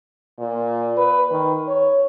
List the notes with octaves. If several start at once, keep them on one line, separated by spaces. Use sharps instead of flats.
A#2
B4
D#3
C#5